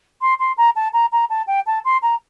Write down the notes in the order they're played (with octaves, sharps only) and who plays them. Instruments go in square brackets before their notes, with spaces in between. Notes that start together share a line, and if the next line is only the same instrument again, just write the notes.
[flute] C6
C6
A#5
A5
A#5
A#5
A5
G5
A5
C6
A#5